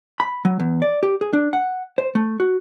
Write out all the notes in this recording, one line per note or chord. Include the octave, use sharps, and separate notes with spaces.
B5
F#3
E2
D5
G4
G#4
D4
F#5
C5
A3
F#4